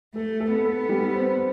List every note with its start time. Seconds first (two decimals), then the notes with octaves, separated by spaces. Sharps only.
0.15 A3 A4
0.40 A4
0.53 B3
0.65 A4
0.89 G3
1.14 C4